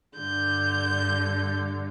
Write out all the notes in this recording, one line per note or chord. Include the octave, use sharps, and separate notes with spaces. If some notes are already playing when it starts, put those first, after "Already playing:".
G2 D3 G6